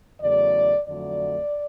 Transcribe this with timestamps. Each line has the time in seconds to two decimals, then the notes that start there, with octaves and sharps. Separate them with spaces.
0.20 E2 C#3 F#3 A3 D5
0.87 F2 D3 F#3 A3 D5